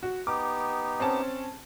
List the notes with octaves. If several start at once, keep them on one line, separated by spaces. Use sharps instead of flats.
F#4
B3 D#4 G4 D6
C4 C#4 A5